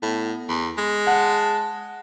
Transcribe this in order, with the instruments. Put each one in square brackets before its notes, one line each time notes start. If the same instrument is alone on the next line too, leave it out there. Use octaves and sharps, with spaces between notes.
[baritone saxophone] A2 [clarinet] B3
[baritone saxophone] E2
G#3
[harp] F#5 [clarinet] A5